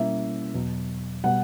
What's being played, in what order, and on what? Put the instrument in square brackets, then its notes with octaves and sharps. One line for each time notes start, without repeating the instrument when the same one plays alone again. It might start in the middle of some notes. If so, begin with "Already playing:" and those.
Already playing: [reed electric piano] B2 G3 A#3 C#4 E4 [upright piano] E5
[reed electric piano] E2 B2 F#3
[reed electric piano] B2 G3 [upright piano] F#5